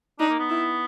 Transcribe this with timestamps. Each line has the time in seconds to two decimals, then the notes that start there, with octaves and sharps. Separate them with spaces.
0.19 D4 D#4
0.29 A#3
0.39 B3
0.50 E4